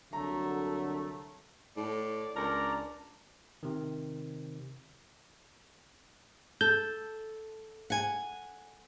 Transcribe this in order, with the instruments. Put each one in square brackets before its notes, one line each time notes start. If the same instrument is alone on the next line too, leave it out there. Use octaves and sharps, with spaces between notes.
[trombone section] C2 D3 F#3 [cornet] A3 [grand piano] A#5
[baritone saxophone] A2 [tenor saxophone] D5
[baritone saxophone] C#2 [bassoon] D4 [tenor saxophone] A#4 [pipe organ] D5 A#5
[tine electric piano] C3 D#3
[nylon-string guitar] A4 [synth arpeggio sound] G6
[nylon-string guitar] F#5 G#5